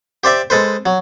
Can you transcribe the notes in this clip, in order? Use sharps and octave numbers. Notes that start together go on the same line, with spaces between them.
G4 C5 D5 E5
G#3 A4 B4 C5
F#3